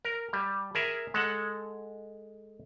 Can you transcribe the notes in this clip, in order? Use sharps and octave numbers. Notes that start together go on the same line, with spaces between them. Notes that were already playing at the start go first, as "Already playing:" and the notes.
A#4
G3
G#4 A#4 E5
G#3 A4 F#5